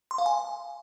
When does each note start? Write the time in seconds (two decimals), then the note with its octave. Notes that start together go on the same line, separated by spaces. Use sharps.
0.11 C6
0.18 F5
0.26 G#5